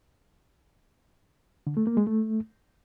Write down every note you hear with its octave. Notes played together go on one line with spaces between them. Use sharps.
D3
A3
A#3
G#3
A3